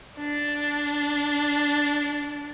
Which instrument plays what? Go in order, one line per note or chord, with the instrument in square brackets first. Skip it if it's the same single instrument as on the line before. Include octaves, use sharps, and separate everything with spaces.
[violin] D4